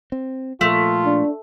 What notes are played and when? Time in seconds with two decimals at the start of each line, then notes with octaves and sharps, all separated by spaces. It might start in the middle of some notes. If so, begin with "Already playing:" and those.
0.12 C4
0.61 A#2 F3 A3 F4
1.05 D4